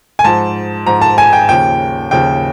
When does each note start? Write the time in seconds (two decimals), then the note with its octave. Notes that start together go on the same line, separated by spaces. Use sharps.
0.19 G#5
0.24 G#2 F3 A5
0.86 G#2 F3 A#5
1.01 A5
1.18 G#5
1.33 G5
1.48 D#2 C#3 F3 G5
2.11 D#2 C#3 F3 G5